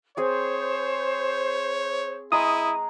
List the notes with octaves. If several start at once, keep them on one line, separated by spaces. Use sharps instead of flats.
C4 G#4 C5 C#5 G#5
G#3 E4 G#4 A#5 D#6